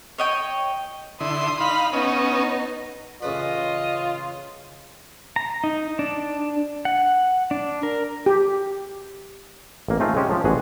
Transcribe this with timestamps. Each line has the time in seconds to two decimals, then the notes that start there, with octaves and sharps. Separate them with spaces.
0.18 C#5 D#5 G5
1.20 D3 E4 C6 D#6
1.60 D#4 F5 B5
1.93 B3 C#4 D#4 D#5
3.22 A1 C#3 F4 B4 D#5
5.36 A#5
5.64 D#4
5.99 D4
6.85 F#5
7.51 D4
7.83 A#4
8.26 G4
9.88 A1 A#3
10.00 A3 C4 D#4 F4 G#4
10.16 G#3 C#4 G4 C5
10.31 F3
10.44 A1 B2 F#4 G#4 F#5